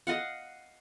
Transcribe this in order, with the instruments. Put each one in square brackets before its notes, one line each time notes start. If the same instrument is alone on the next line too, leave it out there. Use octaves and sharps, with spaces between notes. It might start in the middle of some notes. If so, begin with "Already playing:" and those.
[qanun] D#5 F5 F#5